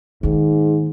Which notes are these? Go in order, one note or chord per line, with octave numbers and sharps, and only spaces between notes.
G#2 D#3 A#3